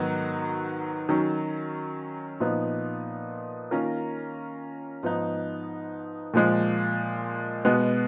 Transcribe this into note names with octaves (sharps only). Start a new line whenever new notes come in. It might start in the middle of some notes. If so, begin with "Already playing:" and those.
Already playing: G#2 D#3 F#3 B3 F#4
D#3 F#3 C#4
A#2 F3 B3 D#4
D#3 A#3 C#4 F4 A#4
G#2 F3 B3 D#4
A#2 F3 G#3
B2 G#3 B3